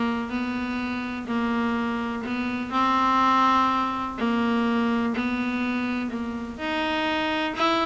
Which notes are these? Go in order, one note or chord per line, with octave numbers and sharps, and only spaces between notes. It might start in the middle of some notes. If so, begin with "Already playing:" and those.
Already playing: A#3
B3
A#3
B3
C4
A#3
B3
A#3
D#4
E4